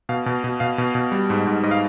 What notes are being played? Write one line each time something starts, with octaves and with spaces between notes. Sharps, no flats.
B2 F5
B2
B2
B2 F5
B2
B2
G3
G#2
G#2
G#2 D#5
F5